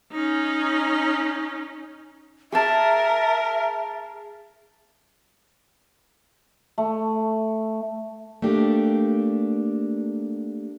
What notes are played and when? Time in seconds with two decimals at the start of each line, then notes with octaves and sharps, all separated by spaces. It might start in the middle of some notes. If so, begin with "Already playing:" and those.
0.12 C#4 D#4
2.52 G#4 A#4 E5 A5
6.78 A3
8.42 A3 A#3 D4 G4